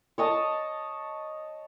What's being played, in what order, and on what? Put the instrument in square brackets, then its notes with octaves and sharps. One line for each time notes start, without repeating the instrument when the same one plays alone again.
[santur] C#5 D#5 A5 D#6